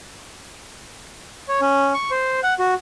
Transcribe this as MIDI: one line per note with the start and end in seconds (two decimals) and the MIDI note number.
1.48 1.61 73
1.61 1.93 61
1.94 2.11 85
2.11 2.40 72
2.43 2.54 78
2.59 2.74 66